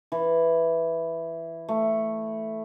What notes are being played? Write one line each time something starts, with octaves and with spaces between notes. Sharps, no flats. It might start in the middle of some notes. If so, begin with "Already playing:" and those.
E3
A3